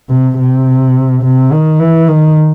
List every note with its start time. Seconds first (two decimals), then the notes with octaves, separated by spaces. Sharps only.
0.09 C3
0.38 C3
1.23 C3
1.52 D#3
1.79 E3
2.08 D#3